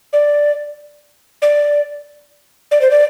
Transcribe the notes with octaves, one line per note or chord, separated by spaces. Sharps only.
D5
D5
D5
C5
D5